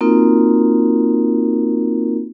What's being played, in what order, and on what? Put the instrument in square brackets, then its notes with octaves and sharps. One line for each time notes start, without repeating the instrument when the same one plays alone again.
[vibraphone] A#3 C4 D#4 F4 F#4 A#4